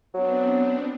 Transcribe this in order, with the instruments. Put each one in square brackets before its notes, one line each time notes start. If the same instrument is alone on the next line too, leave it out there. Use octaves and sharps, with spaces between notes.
[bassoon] F#3 [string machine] B3 C4 D4